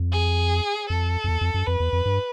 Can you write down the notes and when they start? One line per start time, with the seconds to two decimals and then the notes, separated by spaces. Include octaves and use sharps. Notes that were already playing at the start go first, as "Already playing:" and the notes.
Already playing: F2
0.12 G#4
0.89 F2 A4
1.24 F2
1.28 E2
1.41 F2
1.54 F#2
1.67 F2 B4
1.80 E2
1.93 F2
2.06 G2